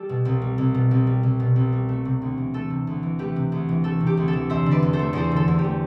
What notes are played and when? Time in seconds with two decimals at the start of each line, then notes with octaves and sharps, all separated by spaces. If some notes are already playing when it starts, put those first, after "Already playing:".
Already playing: G3 G4 A4
0.09 B2
0.25 C2
0.42 G3
0.58 C2
0.74 B2
0.91 C2
1.07 G3
1.23 C2
1.40 B2
1.56 C2
1.73 G3
1.89 A3
2.05 C3
2.22 D2
2.38 E3
2.54 A3 A4
2.70 C3
2.87 D2
3.03 E3
3.19 A3 G4 B4
3.36 C3
3.52 D2
3.69 E3
3.84 A3 A4
4.00 C3
4.07 G4
4.17 D2
4.28 A4
4.33 E3
4.50 E2 C5 E5
4.66 D3
4.71 B4 D5
4.83 E2
4.93 A4 C5
4.99 A3
5.13 E2 A4 C5
5.32 D3 A4
5.48 E2
5.59 G4
5.64 A3